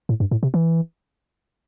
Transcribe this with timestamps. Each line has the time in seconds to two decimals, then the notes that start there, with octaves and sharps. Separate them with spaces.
0.09 A2
0.20 G2
0.31 A2
0.43 C3
0.54 E3